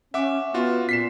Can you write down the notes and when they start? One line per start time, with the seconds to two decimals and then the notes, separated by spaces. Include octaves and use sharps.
0.14 C#4 E5 F#5 D6
0.54 B3 F4 F#4
0.89 A#2 B6 C7 E7